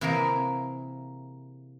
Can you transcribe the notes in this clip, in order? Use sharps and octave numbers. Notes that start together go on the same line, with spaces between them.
C3 E3 A#3 G#4 A#4 E5